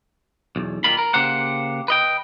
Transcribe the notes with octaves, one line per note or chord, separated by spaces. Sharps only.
B1 E2
A#2 D#3 F4 B5
A#4
C#3 A#3 G4 C5 F#5
B4 D#5 G5